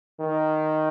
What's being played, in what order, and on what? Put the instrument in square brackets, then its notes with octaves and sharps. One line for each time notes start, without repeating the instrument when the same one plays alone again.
[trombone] D#3